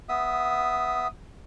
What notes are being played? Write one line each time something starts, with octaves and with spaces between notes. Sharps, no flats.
B3 E5 D#6